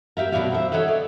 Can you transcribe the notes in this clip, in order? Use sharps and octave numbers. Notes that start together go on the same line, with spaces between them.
A#3 G4 E5 F5
B2 F#3 C4 D4 D5 F5
C5 E5
A4 C#5 D#5 E5 F#5
D5